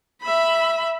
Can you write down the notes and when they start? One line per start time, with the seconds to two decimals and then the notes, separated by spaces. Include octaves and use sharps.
0.22 E5 B5